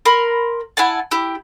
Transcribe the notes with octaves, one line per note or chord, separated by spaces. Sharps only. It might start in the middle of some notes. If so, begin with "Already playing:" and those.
A#4 B5 C6
E4 F#5 G#5 A5
E4 G4